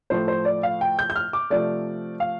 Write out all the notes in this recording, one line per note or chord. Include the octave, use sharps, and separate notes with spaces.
A2 F3 A3 C5
C5
D5
F5
G5
G6
G6
F6
D6
C3 F3 A3 D5
F5